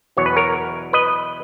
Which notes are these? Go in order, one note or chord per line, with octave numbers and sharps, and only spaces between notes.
E2 B2 F#3 B3 C#5
B4
A#4 C#5
B4 D#5